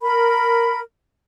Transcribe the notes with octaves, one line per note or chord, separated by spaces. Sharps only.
A#4 B5